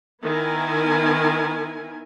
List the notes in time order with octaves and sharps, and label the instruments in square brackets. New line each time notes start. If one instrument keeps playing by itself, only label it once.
[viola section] D#3 B3 E4 A#4 G#5